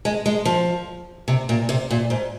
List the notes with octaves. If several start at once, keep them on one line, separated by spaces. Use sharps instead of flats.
G#3
G#3
F3
C3
A#2
C3
A#2
G#2